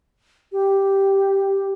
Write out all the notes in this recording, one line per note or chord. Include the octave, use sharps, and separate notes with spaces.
G4